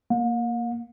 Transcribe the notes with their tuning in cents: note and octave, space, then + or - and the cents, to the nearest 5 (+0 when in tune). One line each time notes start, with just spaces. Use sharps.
A#3 +0 F5 +45